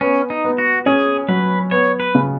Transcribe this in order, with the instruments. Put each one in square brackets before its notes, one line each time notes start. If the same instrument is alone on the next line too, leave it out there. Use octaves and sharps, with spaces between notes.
[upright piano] B3 [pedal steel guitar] C#4
[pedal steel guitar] D#4
[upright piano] B3
[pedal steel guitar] F#4
[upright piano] C#4 [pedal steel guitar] G#4
[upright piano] F#3 [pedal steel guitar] B4
[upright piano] B3 [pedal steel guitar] C#5
[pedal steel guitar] B4
[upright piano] C#3